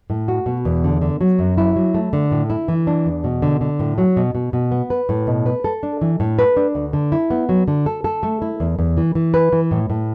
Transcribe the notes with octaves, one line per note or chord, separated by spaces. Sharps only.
A2
F#4
B2
E2
D3
D3
F#3
F#2
E4
F#3
A3
D3
A2
E4
E3
D4
E2
B2
D3
D3
A2
F#3
B2
B2
B2
B3
B4
A2
B2
B4
A4
D4
E3
A2
B4
D4
D2
D3
E4
B3
F#3
D3
A4
A4
A3
E4
E2
E2
E3
E3
B4
E3
A2
A2